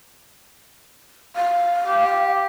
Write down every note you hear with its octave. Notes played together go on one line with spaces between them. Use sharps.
F5
G4